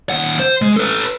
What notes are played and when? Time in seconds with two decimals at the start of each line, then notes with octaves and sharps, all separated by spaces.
0.10 D#2 F#5
0.40 C5
0.62 G#3
0.77 A4 B4